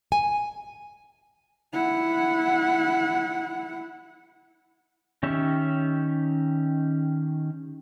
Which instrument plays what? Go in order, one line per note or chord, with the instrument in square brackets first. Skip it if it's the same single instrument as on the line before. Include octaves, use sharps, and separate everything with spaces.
[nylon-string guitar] G#5
[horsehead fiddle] E4 F#5
[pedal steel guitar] D#3 C#4 G4 E5